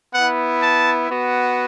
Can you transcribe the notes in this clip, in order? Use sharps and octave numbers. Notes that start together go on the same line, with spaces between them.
B3 E4 F#5
A5
B3 F#4